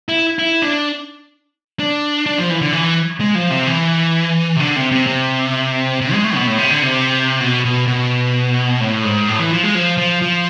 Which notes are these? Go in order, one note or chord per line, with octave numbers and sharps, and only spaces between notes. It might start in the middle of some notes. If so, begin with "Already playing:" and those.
E4
E4
D4
D4
D4
F3
E3
D3
E3
G#3
F3
C3
E3
C3
D3
C3
C3
C3
C3
G#3
A3
B2
A2
C3
D3
C3
B2
B2
B2
A2
G#2
A2
E3
F3
G#3
F3
F3
F3